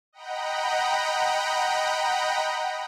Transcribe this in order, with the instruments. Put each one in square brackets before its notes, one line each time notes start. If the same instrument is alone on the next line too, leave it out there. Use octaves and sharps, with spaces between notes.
[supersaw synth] D#5 F#5 G5 A#5 B5